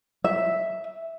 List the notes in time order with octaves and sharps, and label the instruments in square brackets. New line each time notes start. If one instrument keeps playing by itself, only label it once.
[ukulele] E5